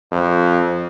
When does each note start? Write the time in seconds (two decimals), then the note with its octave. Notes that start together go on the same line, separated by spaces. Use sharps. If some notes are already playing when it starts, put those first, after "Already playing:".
0.12 F2